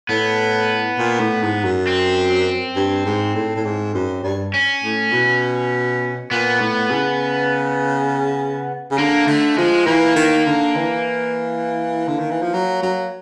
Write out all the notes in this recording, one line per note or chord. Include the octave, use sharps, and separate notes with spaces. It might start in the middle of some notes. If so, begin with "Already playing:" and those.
A2 B3
A#2
A2
G#2
F#2
C4
G2
G#2
A2
A2
G#2
F#2
G2
C#4
A2
B2
A#2 B3
A2
C#3
C#3
D3 A#3
D3 A3
F3 G#3
E3 A#3
D#3
D3
E3
D3
D#3
E3
F3
F#3
F#3